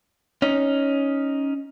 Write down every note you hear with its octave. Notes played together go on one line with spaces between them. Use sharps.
C#4 D#4